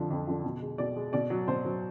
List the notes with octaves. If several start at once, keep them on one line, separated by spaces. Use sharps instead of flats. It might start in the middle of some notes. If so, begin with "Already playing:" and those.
Already playing: F2 D3 F3
F2
D3 F3
B2
G#3
B2 D5
G#3
B2 D5
F#3
B2 C5
F#3